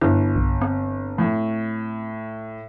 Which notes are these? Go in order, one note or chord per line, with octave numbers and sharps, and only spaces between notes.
G1 E4
B1
C4
A2